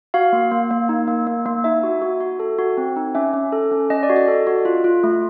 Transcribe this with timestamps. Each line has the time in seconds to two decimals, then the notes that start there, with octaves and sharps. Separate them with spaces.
0.14 F#4 F5
0.33 A#3
0.51 A#3
0.71 A#3
0.89 D#4
1.08 A#3
1.27 A#3
1.46 A#3
1.64 D#4 E5
1.83 F#4
2.02 F#4
2.21 F#4
2.39 A4
2.58 F#4
2.77 C4
2.96 D#4
3.15 C#4 E5
3.33 C#4
3.52 A4
3.72 C#4
3.90 C#4 D#5
4.03 D5
4.10 F#4
4.16 D#5
4.28 A4
4.47 F#4
4.65 F4
4.84 F4
5.03 A3